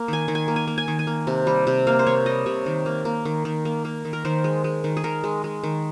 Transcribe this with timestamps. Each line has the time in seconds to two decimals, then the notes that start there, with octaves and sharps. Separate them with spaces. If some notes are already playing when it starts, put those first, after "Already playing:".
Already playing: A#3
0.08 D#3 G#5
0.28 D#3
0.35 G#5
0.48 A#3
0.56 G#5
0.68 A#3
0.78 G#5
0.88 D#3
0.99 G#5
1.07 A#3
1.27 C3
1.47 G3
1.67 C3
1.87 A#3 F5
1.99 C5
2.06 C3 C#5
2.26 G3 D#5
2.46 C3 C#5
2.66 D#3
2.86 A#3
3.05 A#3
3.25 D#3
3.45 D#3
3.65 A#3
3.85 A#3
4.05 D#3
4.13 A#4
4.25 D#3 C5
4.44 G#3
4.64 G#3
4.84 D#3
4.97 G#4
5.04 D#3 A#4
5.24 G#3
5.44 G#3
5.63 D#3